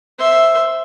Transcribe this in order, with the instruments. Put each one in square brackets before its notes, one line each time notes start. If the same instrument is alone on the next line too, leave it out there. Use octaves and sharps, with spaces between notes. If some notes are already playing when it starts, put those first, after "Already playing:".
[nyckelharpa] C5 E5